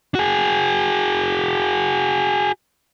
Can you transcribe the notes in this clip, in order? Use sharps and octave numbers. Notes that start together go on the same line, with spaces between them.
F#4 G#4